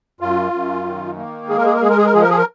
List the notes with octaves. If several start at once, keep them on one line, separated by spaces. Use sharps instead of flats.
F#2 F4
F#2
D#3
A#3
G#3 G#4
A#4
G#4
A#4
G#3 G#4
A#4
G#4
A#4
F3 G#4
A#4
G#4
A#4